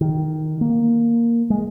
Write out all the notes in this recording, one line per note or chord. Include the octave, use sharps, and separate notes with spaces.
D#3
A#3
G#3